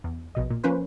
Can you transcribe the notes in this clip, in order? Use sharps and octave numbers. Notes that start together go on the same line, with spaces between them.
E2
A#1 B2 D#5
A#2
F3 A#3 C#4 B4 C5